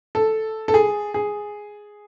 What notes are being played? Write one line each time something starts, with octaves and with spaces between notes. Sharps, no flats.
A4
A4
G#4
G#4